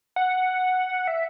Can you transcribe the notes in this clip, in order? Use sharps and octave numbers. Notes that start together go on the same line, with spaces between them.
F#5
E5